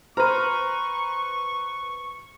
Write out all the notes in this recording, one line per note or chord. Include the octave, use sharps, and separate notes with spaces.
B4 C5 A#5 C6 C#6 F6